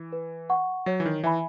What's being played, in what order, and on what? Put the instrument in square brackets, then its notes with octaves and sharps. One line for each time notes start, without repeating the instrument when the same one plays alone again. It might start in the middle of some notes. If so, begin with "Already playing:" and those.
Already playing: [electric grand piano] E3
[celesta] B4
F#5 C#6
[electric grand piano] F#3 [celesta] C#5
[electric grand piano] E3
D#3
[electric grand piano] E3 [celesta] E5 G#5 B5